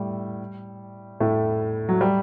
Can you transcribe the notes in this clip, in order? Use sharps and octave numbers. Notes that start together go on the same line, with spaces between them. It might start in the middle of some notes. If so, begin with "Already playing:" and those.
Already playing: A2 G3 A3
A2 A3
F#3
G3